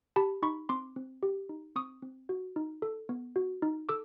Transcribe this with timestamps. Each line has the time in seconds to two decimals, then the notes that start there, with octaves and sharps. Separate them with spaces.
0.16 G4 A5 B5
0.42 D#4 B5 C#6
0.69 C4 C6 D6
0.96 C4
1.23 G4
1.49 D#4
1.76 C4 C#6 D#6
2.02 C4
2.29 F#4
2.56 D#4
2.82 A4
3.09 B3
3.36 F#4
3.62 D#4
3.89 A4 D6 E6